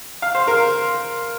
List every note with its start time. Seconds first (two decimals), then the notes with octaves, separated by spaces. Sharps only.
0.22 F5
0.35 C5
0.48 A#4